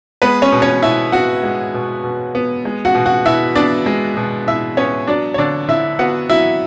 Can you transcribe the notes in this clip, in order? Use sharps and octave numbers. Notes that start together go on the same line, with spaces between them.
G#3 B3 B4
C#4 C#5
B2
C#4 C#5
B2 E4 E5
B3 F#4 F#5
G#3
B2
B2
B3
G#3
F#4 F#5
B2
F#4 F#5
B2 E4 E5
B3 D4 D5
G#3
B2
B2 E4 E5
B3 C#4 C#5
F#3 D4 D5
C#5
D3 D4 D5
D3 E4 E5
B3 F#4 F#5
F#3 E4 E5